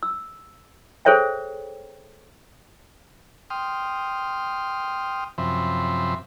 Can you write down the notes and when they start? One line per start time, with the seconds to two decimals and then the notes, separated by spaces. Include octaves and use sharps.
0.03 E6
1.05 G#4 A4 C5 C#5 E5 G5
3.50 G5 C6 D#6 F6
5.38 F#2 C3 F3 E5 B5 C6